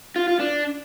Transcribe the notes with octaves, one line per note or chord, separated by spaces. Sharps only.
F4
F4
D4